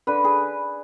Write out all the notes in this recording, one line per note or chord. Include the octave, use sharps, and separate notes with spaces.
D3 B4
G#4